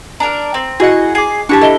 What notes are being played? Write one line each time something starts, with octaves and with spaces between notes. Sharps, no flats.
D4 A#4 A#5
C4
E4 F#4 G#4 D#5 F#5
G#4 D6 C7
D4 E4 G4 A5 A#5 C#6
E4 A4 D#5 G7